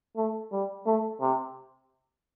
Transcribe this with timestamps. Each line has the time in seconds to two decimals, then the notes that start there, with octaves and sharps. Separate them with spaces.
0.17 A3
0.52 G3
0.86 A3
1.21 C3